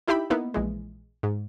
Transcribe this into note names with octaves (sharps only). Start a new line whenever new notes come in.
D#4 E4 G4 E5 G5 B5
A#3 B3 D#4 E4
A#1 E3 G#3
G#2